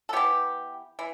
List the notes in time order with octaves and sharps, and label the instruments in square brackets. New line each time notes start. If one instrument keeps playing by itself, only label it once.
[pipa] A4
E3 B3 G4
E3